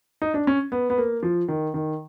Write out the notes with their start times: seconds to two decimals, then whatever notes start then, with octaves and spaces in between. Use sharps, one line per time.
0.22 D#4
0.34 D4
0.47 C#4
0.72 B3
0.90 B3
0.98 A#3
1.23 F3
1.48 D#3
1.74 D#3